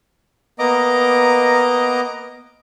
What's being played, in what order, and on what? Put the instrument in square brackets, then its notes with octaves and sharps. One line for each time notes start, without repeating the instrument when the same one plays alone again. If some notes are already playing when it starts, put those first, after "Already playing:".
[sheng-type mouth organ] A#3 B3 D#5 A#5 D6